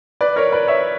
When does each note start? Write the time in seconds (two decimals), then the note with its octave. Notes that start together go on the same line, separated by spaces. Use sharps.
0.21 B4 D5
0.36 A#4 C#5
0.52 B4 D5
0.67 C#5 E5